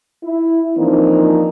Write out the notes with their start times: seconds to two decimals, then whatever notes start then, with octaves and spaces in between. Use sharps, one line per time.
0.23 E4
0.77 E3 F3 A#3 C4 D4 D#4